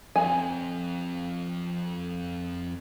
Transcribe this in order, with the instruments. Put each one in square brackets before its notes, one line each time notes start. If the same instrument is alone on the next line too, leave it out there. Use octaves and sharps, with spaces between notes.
[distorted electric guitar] F2 [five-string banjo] G#5